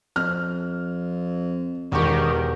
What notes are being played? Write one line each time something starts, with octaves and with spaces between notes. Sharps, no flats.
F2 F6
E1 D#3 G4 A#4 C#6